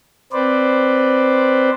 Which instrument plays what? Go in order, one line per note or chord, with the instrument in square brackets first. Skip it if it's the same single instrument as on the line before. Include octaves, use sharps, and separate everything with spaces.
[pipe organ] C4 B4 C5 D5